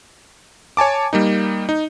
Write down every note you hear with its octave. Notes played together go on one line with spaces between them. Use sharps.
C#5 G#5 A5 D6
G3 A#3 D#4
D#4